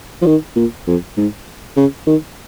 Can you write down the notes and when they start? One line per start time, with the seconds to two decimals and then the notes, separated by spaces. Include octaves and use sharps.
0.22 F3
0.26 D#3
0.56 A#2
0.87 F2
1.17 G#2
1.76 C#3
2.06 D#3